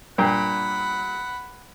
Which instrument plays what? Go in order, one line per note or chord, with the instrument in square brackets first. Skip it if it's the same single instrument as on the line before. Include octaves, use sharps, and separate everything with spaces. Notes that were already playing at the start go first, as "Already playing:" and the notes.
[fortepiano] G2 A#2 G5 [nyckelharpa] F#5 B5